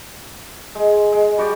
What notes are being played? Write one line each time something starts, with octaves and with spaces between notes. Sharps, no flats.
G#3
G#3
G3 F#4 G4 D5